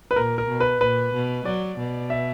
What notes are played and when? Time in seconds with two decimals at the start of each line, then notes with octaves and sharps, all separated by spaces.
0.11 B4
0.16 A#2 A#4
0.38 A#4
0.49 B2
0.60 B4
0.81 A#2 B4
1.14 B2
1.45 F#3 D5
1.79 B2
2.10 E5